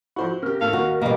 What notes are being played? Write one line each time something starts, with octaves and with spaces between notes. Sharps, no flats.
F3 E4 F#4 C5 F#5
C#3 G4 A#4
A2 C#4 A4 F5
D#2 F#4
A1 B2 G3 A#3